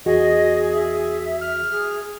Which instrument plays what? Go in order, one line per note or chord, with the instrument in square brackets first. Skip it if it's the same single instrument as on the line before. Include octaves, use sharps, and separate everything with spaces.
[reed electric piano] E2 F#4 [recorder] G#4 [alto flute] D#5
[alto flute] E5
[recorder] F6
[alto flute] G#4